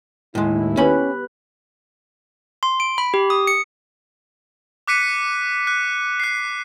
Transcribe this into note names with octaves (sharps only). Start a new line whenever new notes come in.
D#2 A2 G#3 E4
B3 C#4 G4 B4 B5
C6
D7
B5
G4
D#6
C#7
D6 F#6 B6 C#7 D#7
F#6
F#6 C7